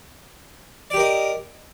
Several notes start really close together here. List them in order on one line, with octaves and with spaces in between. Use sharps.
D5 G4 A#4 D#5